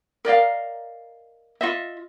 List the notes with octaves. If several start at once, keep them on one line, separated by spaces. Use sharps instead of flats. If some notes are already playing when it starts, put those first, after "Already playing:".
A#4 D5 D#5 F5
F4 D#5 E5